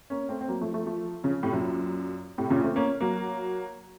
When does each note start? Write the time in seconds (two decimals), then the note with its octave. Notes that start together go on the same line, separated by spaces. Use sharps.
0.10 A#3 C#4
0.29 A3 C4
0.41 C4
0.48 F#3 A#3
0.61 F3 A3
0.73 F3 A3
0.86 F3 A3
1.24 C#3 F3
1.43 A2 C3
1.52 F#2 A#2
2.38 A2 C3
2.50 A#2 C#3
2.63 A3 C4
2.76 A#3 C#4
3.01 F#3 A#3